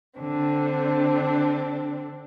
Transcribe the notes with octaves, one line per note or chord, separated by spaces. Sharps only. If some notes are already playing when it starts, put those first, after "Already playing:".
D3 C4 D4